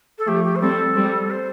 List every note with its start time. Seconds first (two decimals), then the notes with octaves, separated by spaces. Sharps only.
0.18 A4
0.27 F3 A3 G4
0.44 G4
0.55 C5
0.61 G3 C4 A4
0.96 G3 C4
1.30 C5